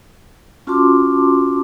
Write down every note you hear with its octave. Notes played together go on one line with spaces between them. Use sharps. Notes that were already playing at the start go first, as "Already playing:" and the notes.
C#4 F4 F#4 A5 C6 D6